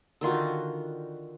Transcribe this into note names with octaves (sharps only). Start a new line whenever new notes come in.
D3 D#3 F4 F#4